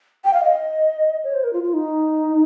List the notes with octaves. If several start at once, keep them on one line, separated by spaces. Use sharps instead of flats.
G5
F5
D#5
C#5
C5
A#4
F4
F4
D#4